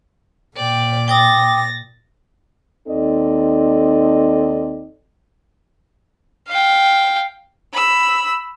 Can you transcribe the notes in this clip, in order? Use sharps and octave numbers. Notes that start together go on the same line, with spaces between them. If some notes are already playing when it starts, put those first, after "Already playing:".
A#2 D5 G5
G5 D6 D#6 A6 A#6
D#2 C4 D#4 A4 D5 D#5
F5 G5
B5 E6